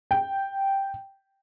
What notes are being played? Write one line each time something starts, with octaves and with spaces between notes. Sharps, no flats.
G5